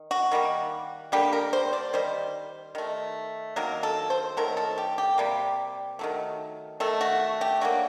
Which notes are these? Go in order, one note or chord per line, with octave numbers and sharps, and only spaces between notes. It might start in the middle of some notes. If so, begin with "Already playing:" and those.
Already playing: D#3
F#4
D#3 G3 A#3
D3 G3 A#3 G4
A#4
C5
D5
D#3 G3 C5
D#3 A3
D#3 F#3 A#3 A#4
A4
C5
D#3 F#3 A3 A#4
A4
G4
G4
C3 G3 A#3
D#3 F#3 A3
D#3 A3 A4
F#4
G4
D3 F#3 A#3 F#4